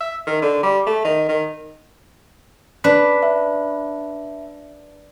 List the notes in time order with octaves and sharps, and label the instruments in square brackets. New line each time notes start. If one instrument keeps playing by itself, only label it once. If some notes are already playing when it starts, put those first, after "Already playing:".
[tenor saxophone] E5
D#3
D3
G3
A3
D#3
D#3
[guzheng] D4 B4 [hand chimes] B6
[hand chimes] E5